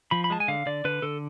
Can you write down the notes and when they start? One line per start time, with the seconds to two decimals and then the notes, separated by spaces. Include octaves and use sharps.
0.11 F3 B5
0.24 B5
0.30 G#3 A5
0.40 G#5
0.48 D3 F5
0.66 D3 D5
0.85 D3 B4
1.02 D3 A4